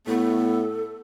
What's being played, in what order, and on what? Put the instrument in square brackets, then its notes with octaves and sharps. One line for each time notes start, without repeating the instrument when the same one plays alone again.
[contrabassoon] A2 [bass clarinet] B3 [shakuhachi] A4